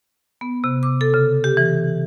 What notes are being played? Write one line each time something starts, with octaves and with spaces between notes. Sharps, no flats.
B3
C3
D6
A4
C#3
G4
E3